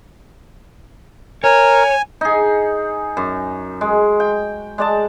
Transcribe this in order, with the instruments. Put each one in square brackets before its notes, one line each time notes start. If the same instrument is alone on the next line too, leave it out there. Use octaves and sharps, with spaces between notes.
[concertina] A#4 [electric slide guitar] C#5 [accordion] G#5
[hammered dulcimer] D#4 G#4
F#2
G#3
G5
G#3 D5 A5